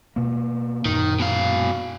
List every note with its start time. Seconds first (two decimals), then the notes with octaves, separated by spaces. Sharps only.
0.16 B2 A#3
0.86 F#2 A#2 D#3
1.20 B2 F5